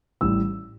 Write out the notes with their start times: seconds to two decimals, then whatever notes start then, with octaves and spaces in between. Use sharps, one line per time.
0.21 A1 A2 E3 G3 E6